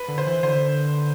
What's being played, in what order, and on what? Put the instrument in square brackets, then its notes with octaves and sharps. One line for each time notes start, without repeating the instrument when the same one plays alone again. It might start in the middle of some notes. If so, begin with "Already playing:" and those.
Already playing: [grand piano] B4
[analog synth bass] D3
[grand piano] C5
[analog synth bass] E3
[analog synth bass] D3 [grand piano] C5